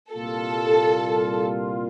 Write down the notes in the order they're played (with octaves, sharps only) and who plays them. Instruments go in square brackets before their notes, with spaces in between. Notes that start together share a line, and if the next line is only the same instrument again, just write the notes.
[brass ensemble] C2 A#2 G3 A#3 F4 [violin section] A4